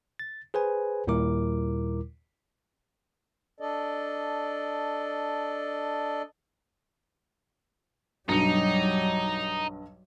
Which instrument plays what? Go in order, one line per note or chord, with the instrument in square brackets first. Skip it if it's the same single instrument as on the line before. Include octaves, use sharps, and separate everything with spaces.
[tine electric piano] A6
G#4 B4 C5 G#5
D#2 A#2 G3 E4 A#4 D6
[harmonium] D4 A4 D5 D#5
[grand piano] B1 G2 C#7 [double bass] F#3 G3 [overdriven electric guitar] D#4